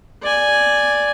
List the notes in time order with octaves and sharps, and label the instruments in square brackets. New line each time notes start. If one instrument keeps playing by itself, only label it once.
[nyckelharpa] D5 G#5